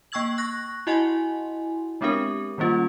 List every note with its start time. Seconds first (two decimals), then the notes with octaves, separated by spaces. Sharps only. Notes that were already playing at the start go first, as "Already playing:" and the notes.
0.12 A#3 G5 C#6 E6 G#6 F#7
0.38 C#6 F#6 A#6
0.87 E4 F#4 D#5 F#5 G#5 C6
2.01 G#3 B3 C4 D4 G4 A#4
2.58 D#3 G3 A#3 C#4 F4